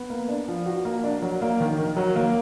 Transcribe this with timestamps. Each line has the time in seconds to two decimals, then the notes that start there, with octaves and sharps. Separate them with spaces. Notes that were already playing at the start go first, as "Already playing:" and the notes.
Already playing: B3
0.10 A#3
0.29 D4
0.48 F3
0.66 F#4
0.85 A#3
1.03 D4
1.22 F#3
1.42 A#3
1.60 D#3
1.78 D#3
1.96 F#3
2.16 A#3